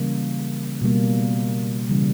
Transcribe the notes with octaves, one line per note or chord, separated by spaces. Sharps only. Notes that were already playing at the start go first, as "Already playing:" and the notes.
Already playing: C#3 E3 G3 A#3
B2 G3 A#3
C#3 E3 G3